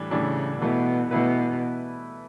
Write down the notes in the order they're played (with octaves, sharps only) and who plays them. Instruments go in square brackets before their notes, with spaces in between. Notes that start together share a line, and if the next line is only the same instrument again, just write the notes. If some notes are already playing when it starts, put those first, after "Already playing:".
Already playing: [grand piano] A2 E3 G3 D4
[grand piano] A2 E3 G3 D4 [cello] C#3
[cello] B2 [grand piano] E3 A3 E4 B4
[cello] B2 [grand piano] E3 A3 E4 B4